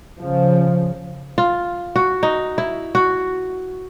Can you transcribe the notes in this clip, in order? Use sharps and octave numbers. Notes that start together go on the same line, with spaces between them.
C#3 F3
F4
F#4
D#4
E4
F#4